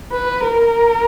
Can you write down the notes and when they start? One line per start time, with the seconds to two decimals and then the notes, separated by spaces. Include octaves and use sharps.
0.12 B4
0.45 A#4